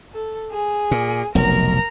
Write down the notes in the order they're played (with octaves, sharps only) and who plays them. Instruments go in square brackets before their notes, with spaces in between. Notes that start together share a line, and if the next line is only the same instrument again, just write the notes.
[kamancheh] A4
G#4
[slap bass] A#2
[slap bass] F1 B1 [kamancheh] A#4 A#5